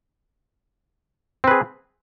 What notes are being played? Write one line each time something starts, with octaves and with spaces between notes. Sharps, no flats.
C4 G#4 B4